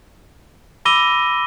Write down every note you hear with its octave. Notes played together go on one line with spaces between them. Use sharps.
B5 D6 E6 A#6 D#7 G7